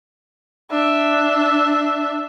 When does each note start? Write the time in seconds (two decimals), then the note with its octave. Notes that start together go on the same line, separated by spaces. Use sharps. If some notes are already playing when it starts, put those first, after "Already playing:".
0.71 D4 E5